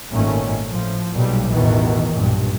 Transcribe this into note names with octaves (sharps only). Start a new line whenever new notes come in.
G#1 A#2 D#3 A3 C#4
A2 F3
B1 A#2 G3
A1 E2 B2 D#3 E3
B1 G2 A#2